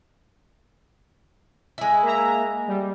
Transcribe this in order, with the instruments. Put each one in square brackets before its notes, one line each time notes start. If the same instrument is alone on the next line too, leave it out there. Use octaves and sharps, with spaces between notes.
[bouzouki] G#3 E4
[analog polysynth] A#3 E5 A#5
G3